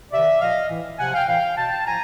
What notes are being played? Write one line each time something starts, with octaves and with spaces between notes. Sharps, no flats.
C3 D#3 D5 E5
A#2 F3 D#5 F5
A2 E3
C3 F3 F#5 G#5
F5 G5
A2 E3 F5 G5
B2 G5 A5
A2 F3 G#5 A#5